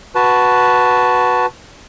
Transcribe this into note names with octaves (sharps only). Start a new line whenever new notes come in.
F#4 B4 A5